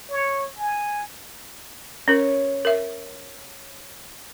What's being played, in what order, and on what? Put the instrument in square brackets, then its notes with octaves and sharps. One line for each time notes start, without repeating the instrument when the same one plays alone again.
[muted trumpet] C#5
G#5
[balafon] C#4 A#4 [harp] C#5
[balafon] A#4 E5